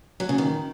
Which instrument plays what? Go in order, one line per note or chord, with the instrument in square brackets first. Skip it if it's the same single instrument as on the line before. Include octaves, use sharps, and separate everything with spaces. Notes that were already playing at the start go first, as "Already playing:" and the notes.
[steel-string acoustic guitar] F#3
C#3
D#3